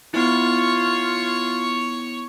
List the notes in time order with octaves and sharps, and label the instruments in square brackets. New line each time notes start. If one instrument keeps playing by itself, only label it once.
[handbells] B3 E4 [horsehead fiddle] F4 [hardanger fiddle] C#5 C#6